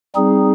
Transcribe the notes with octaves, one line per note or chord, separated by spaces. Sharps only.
G3 C4 D#4 G#4